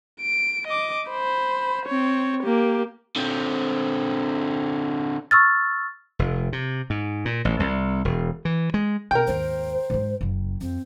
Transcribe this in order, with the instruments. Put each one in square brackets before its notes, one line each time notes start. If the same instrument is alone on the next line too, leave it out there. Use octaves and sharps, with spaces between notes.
[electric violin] D7
D#5 D6
C5 B5
C4 C#5
A#3 G4
[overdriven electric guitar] D3 C4
[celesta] C#6 E6 F6 A6
[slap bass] F1
C3
G#2
A#2
A1
C2
E1
E3
G#3
[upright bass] B2 [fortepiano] A#4 G5
[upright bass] G#1 D#2 [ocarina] C5
[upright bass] G#2 G#3
F#1 C#3
[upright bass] F2 [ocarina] C4